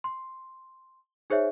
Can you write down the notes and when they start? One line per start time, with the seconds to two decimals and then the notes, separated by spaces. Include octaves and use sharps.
0.04 C6
1.30 D#4 G#4 C5 C#5 E5